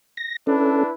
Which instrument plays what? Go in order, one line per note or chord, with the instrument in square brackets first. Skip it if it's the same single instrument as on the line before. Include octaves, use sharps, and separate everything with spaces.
[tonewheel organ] A#6
[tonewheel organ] C#4 A4 [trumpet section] D4 E4 B4